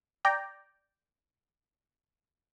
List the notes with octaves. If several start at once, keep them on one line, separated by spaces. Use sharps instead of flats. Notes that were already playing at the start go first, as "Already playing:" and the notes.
D5 G5 A#5